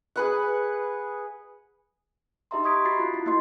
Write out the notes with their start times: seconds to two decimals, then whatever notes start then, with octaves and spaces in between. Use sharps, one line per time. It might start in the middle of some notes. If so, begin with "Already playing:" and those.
0.16 G#4 B4 F#5
2.51 D#4 G4 D#5 E5 A#5 C6
2.64 C6 C#6 D#6 G#6 B6 D7
2.85 F#4 B5 A6 B6 C7
3.00 F4
3.14 E4
3.26 A#3 E4 F#4 D#5 C6 C7